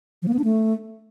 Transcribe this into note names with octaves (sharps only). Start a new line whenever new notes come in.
F3
A#3
B3
D4
A3